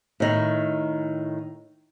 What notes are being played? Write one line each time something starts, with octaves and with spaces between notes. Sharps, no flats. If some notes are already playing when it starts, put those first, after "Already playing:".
A2 D#3